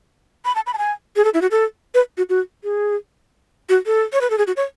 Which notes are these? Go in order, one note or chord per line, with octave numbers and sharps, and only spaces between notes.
B5
A5
B5
A5
G#5
G#4
A4
E4
F#4
A4
B4
F#4
F#4
G#4
F#4
A4
C#5
B4
A4
G#4
F#4
C#5